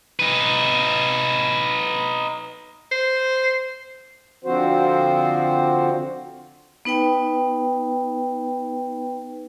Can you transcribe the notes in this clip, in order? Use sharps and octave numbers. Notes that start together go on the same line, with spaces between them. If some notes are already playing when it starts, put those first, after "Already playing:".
D#4 B4
C5
D3 F3 C4 F#4 C5
B3 D#4 B4 G5